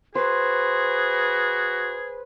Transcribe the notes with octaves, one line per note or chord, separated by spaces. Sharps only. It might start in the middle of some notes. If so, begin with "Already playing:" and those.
F#4 G#4 B4 C5